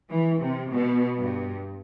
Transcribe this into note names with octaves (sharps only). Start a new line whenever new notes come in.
E3
C3
B2
G2